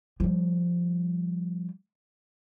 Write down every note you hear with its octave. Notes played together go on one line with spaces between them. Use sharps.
F3 G3